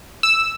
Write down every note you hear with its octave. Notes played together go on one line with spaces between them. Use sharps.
E6